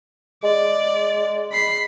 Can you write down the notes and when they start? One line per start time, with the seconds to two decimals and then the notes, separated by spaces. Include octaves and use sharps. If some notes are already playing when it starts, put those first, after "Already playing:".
0.44 G#3 D5
1.52 B5 C7